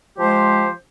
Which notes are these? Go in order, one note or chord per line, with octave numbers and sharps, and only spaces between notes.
F3 G#3 G4 C5